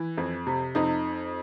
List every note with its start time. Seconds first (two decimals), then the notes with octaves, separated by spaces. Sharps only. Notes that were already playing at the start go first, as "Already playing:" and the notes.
Already playing: E3
0.18 F2
0.47 C3
0.75 F2 D#4